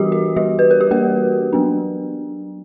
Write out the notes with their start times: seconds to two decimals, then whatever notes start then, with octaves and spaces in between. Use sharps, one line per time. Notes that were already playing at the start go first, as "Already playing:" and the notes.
Already playing: E3 G3 B3 D4 F#4 G4
0.12 F#4
0.36 G3 G4
0.59 B4
0.71 A#4
0.81 G4
0.91 A#3 A#4
1.53 F#3 B3 D4